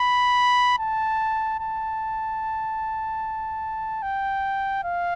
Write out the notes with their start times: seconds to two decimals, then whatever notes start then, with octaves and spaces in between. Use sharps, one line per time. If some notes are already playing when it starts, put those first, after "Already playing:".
Already playing: B5
0.79 A5
1.60 A5
4.02 G5
4.84 F5